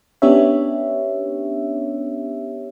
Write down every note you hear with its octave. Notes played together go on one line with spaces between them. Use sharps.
B3 C#4 D4 G4 C#5 E5